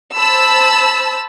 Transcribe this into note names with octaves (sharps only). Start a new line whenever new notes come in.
C5 A5 B5 E6